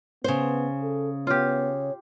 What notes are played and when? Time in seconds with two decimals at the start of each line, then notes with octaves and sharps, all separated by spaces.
0.24 C#3 B3 C5
0.82 A4
1.27 B3 F4 G4 C#5